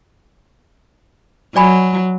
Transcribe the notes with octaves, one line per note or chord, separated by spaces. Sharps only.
F#3 D5 G#5 B5